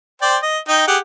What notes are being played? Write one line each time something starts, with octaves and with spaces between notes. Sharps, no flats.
C5 D5 G5
D#5
D#4 D#5 G5
G4 G#4 F#5